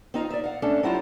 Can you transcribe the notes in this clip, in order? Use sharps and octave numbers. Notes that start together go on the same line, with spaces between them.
C4 D#4 F4 F5
D5 E5
F5 F#5
A3 C#4 D4 A4
F#3 C4 E4 F4 G4